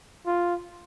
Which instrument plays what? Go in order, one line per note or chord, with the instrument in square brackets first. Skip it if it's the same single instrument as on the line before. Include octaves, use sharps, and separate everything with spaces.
[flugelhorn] F4